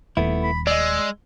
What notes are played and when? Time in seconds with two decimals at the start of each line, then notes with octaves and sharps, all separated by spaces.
0.17 D#1 A3 B3 E4
0.43 B5
0.67 G#3 D5 D#5 E6